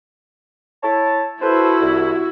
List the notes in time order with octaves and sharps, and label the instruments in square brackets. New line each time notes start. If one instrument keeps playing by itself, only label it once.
[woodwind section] E4 C#5 A5
[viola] E4 F#4 [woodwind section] A4 B4 C5
[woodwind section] C2